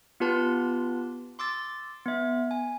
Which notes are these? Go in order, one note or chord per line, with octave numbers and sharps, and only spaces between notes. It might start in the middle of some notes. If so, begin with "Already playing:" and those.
B3 F4 G4 B4 A5 C6
C6 D6 E6 A6
B3 E5
G#5